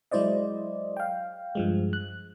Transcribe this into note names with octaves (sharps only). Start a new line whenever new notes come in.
F#3 G#3 E4 C5 D5 D#5
F5 G5
G2 F3 G#3
F#6